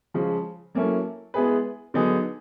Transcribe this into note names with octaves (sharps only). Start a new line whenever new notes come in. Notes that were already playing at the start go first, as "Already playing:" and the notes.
C#3 F3 G#3
F#3 A#3 C#4 E4 A4
G#3 B3 E4 G#4 B4
D3 F#3 B3 D#4 G#4